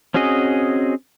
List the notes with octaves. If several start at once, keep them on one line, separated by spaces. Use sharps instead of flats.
C4 C#4 F#4 G#4 D#5